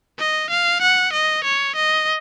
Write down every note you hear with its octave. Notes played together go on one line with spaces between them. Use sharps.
D#5
F5
F#5
D#5
C#5
D#5